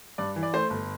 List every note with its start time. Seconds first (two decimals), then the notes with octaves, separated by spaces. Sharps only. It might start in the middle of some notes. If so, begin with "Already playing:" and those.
0.18 G2 D5
0.36 E3
0.43 D5
0.54 A3 C5
0.70 G1